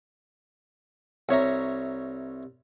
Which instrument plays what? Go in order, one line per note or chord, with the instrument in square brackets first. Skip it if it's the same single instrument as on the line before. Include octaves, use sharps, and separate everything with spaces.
[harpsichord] C2 C#5 E5 A#5